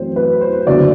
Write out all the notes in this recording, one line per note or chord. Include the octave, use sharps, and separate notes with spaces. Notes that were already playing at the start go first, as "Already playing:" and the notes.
Already playing: F#2 E3 A3 C4 C5
B4
C5
F#1 F#2 D3 F#3 B3 D5